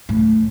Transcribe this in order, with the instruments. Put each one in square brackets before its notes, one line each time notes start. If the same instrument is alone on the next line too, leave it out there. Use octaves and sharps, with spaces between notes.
[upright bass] A2